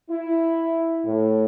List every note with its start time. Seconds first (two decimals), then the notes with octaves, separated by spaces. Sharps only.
0.10 E4
1.05 A2